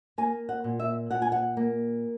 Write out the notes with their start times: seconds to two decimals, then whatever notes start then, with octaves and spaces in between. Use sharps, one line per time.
0.18 A#3 G#5
0.49 F#5
0.64 A#2
0.80 E5
1.11 A#2 F#5
1.22 G#5
1.32 F#5
1.57 A#3